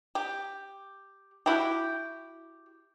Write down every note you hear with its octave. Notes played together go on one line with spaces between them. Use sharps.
G4
E4 F#4 G4